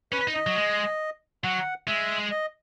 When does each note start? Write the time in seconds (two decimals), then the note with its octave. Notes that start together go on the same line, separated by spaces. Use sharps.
0.12 C#4 B4
0.27 D#4
0.34 D#5
0.47 F#3
0.56 G#3
1.44 F#3 F#5
1.88 G#3 E5
2.31 D#5